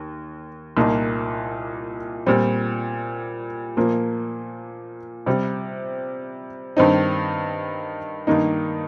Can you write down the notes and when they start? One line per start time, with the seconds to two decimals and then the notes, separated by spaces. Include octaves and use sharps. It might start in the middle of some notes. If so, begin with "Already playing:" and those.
Already playing: D#2
0.77 C2 A#2 A#3 D#4
2.26 A#2 G3 C4
3.77 A#2 F3 A#3
5.26 C3 G3 C4
6.77 G2 D#3 C4 D#4
8.27 G2 D#3 A#3 D#4